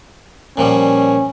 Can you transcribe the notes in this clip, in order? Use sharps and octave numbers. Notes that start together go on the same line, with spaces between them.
A#2 F3 G3 C#4